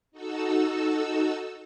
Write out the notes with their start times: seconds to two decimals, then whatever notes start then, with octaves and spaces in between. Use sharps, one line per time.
0.12 D#4 F#4 A4 E6